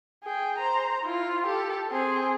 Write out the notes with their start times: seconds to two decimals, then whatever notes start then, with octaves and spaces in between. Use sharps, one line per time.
0.24 G#4 G5
0.58 C5 A#5
1.04 E4 F4
1.46 G4 A4
1.90 C4 G#4